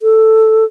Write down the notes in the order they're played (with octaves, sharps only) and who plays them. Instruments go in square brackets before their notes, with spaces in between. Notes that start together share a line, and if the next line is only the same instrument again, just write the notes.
[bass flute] A4